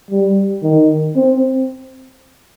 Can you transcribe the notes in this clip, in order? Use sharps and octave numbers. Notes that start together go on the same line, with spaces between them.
G3
D#3
C4